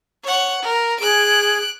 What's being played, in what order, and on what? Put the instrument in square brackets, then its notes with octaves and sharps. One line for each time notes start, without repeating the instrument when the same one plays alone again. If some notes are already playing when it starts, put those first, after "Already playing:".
[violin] C#5 F#5
A#4
[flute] G#4 [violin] F#6 D7